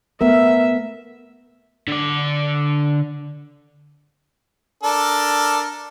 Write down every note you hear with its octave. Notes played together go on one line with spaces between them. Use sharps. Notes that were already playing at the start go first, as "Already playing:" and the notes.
A3 B3 A#4 E5
D3 D5
D4 A4 A#4